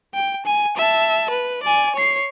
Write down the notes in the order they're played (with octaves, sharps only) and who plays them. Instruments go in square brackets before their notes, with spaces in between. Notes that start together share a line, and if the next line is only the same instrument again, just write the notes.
[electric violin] G5
G#5
E5 A5
B4
D5 G#5
C#5 C7